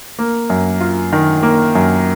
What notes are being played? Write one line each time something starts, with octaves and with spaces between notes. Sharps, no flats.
A#3
F#2
F4
D#3
A#3
F#2